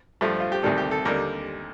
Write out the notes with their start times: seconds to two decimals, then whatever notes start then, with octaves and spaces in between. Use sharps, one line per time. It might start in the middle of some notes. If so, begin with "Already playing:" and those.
0.21 G2 F3 A3
0.40 F4
0.52 G4
0.63 D2 C3 D#3 G3 A4
0.78 G4
0.91 A4
1.05 D#2 D3 G3 A#4